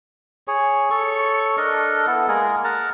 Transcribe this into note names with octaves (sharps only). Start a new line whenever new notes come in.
G#4 C#5
A4 C#5 C#6
D4 A4 A#4 D#5
B3 E4 A4
G#3 A#3 G#4 A#4
A#4 F#5 A5 A#5